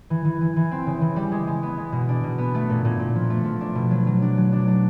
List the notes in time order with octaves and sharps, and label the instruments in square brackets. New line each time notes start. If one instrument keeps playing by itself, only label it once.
[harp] E3
E3
E3
E3
C4
C#3
E3
G3
G#3
G#3
B3
G#3
B2
D4
B2
B3
A3
A#2
A#2
A#2
F3
A3
F3
D4
B2
F#3
F#3
D4
F#3
D4
D4